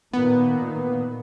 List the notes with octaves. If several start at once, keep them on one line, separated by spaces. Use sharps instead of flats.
A#2 D#3 B3